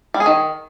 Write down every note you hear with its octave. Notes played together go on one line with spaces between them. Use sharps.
G3
G#4
D#3